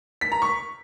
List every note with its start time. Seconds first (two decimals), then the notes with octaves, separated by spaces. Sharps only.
0.21 B6
0.32 A#5
0.42 C#6